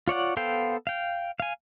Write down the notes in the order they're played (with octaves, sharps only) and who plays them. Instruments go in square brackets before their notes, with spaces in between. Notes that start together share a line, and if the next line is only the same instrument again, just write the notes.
[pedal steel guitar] F4 C#5 D5 F#5
B3 A4 C5 F5 G5
F5 G5
F5 G#5